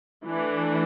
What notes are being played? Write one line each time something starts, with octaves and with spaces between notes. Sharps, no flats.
E3 A3 D4